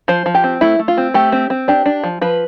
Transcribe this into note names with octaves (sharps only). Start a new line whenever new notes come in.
F3 C5
F3
G4
C4
A3 E4
A3
F4
C4
A3 G4
C4
C4
D4 G4
D4
F3
F3 B4